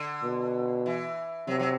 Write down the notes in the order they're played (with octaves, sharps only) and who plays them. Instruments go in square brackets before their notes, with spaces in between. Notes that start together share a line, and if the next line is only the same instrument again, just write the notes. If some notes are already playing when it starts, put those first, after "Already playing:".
Already playing: [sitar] D3
[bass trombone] B2
[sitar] E3
[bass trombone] C3 [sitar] F#3
[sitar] F#3